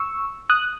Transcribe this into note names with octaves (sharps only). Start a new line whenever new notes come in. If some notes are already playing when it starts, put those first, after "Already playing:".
Already playing: C#6 E6
D#6 F#6